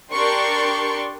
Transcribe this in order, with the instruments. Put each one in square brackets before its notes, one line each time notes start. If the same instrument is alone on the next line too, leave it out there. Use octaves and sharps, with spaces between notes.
[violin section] D4 G4 A#4 D5 C6 C#6